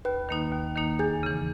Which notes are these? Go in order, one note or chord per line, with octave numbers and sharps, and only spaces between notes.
D#2 B4
D#3 A#3 D#4
D#2
D#3 A#3 D#4
E2 G#4
C#3 E3